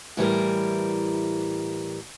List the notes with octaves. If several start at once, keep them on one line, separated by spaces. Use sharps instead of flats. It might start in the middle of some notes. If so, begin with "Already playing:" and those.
A2 E3 G3 A#4